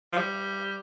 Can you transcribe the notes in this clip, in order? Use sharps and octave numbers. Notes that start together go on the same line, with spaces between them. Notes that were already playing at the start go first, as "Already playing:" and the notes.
F3
G3